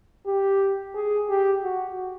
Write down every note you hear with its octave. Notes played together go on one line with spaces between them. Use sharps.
G4
G#4
G4
F#4